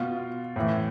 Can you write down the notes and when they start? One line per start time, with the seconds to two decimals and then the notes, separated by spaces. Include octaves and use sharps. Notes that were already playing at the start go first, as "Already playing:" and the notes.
Already playing: B2 F4
0.56 A2 E3